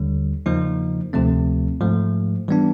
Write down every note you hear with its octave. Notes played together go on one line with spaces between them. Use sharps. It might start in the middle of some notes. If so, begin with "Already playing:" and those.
Already playing: D#2 D3 G3
E2 C#3 F3 A#3 D#4
D2 C3 F3 A3 C4
G#2 F3 A3
E3 G3 B3 D4